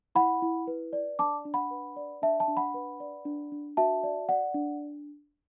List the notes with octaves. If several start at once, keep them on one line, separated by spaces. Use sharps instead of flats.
E4 F#5 B5
E4
B4
D5
D4 A5 D6
D4
F#5 B5
B4
D5
D4 E5 A5
E5 A5
D4
F#5 B5
B4
D5
D4
D4
F#4 E5 A5
D5
D5 F#5
D4